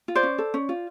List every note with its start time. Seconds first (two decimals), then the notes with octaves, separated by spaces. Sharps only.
0.08 F4
0.15 C5 D5
0.23 C#4
0.38 A4
0.54 C#4
0.69 F4